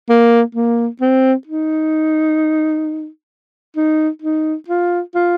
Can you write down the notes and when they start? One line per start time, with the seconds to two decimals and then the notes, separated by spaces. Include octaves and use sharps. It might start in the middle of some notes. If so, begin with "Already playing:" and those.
0.09 A#3
0.55 A#3
1.01 C4
1.47 D#4
3.77 D#4
4.22 D#4
4.68 F4
5.15 F4